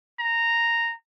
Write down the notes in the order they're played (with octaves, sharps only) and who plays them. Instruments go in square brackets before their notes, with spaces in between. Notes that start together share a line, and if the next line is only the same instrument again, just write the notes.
[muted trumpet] A#5